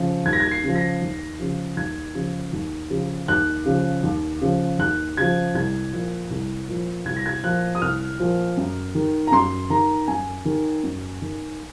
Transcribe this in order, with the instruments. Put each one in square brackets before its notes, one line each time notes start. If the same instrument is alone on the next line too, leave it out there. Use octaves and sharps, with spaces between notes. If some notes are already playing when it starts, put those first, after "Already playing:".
Already playing: [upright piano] C#3 F3
D#2 G#6
A#6
G#6
C7
C#3 F3
A#6
D#2
C#3 F3
D#2 G#6
C#3 F3
D#2
C#3 F3
D#2 F#6
C#3 F3
D#2
C#3 F3
D#2 F#6
C#3 F3 G#6
C2 G#6
A#2 F3
C2
A#2 F3
C2 G#6
A#6
G#6
A#2 F3 F#6
D#6
C2 F6
A#2 F3
F#2
D#3
A#5
F#2 C6
D#3 A#5
F#2 G#5
D#3
F#2
D#3